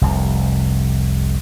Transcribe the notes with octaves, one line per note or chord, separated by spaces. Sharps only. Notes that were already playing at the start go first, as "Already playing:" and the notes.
F1 C2 C3